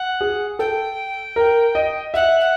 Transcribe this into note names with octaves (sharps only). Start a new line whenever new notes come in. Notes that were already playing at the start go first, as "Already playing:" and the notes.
Already playing: F#5
G#4
A4 G5
A#4
D#5
E5 F#5
F#5